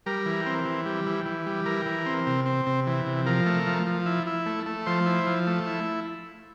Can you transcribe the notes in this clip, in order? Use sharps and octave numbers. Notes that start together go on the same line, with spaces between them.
G3 A#4
E3
C4
E3
G3
E3
E3
G3
E3 A#4
E3
C4
C3
C4
C3
E3
C3
F3 A#4
A3
F3
F3
E4
E4
A3
A3
F3 C5
E4
F3
A3
E4